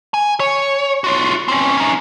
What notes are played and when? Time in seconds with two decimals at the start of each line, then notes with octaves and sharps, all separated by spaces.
0.14 G#5
0.40 C#5
1.04 F4 F#4
1.48 C4 C#4
1.77 C#4 D#4